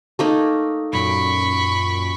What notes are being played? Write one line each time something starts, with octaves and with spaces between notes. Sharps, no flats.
A3 A#3 D#4
F#2 A#2 B5 C#6 D7